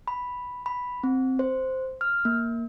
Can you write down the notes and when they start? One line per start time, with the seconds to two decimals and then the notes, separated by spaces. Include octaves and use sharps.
0.08 B5
0.66 B5
1.03 C4
1.39 C5
2.01 F6
2.25 A#3